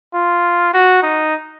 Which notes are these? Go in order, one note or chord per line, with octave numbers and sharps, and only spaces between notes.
F4
F#4
D#4